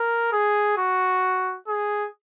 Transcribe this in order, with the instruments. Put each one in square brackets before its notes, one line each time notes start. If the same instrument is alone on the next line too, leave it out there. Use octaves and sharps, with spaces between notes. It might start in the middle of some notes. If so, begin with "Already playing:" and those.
Already playing: [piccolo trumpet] A#4
G#4
F#4
G#4